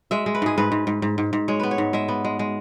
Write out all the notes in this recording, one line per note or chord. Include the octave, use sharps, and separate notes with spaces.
G#3 E5
G#3
B4
G#2 G#4
G#2 B4
G#2
G#2
G#2
G#2
G#2
G#3 C#5
B3 B4
C#5
G#2
G#3 E5
B3
G#3
G#3